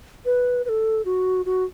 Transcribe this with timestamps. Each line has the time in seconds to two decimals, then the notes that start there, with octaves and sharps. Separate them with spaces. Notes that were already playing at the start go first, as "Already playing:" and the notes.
0.25 B4
0.65 B4
0.69 A4
1.05 F#4
1.46 F#4